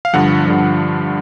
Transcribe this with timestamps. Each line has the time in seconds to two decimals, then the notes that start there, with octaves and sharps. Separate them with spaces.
0.05 F5
0.13 G2 D3 F3 F#5
0.46 G2 D3 F3